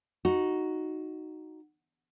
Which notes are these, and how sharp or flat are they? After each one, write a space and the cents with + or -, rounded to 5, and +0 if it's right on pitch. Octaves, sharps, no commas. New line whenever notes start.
D#4 +0 F#4 +0